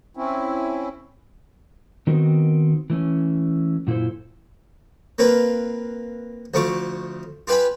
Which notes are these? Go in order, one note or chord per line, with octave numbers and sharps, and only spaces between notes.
C4 C#4 E4
D#3 B3 C4 D#4 F#4 A#4
E3 A3 C#4
F#2 A#2 E4 A4 C5
A#3 C4 F4 B4
D2 F3 A3 C#6 D6
F4 G4 B4 G#5 B5